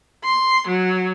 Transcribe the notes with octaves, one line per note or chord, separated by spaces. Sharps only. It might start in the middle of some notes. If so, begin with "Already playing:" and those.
C6
F#3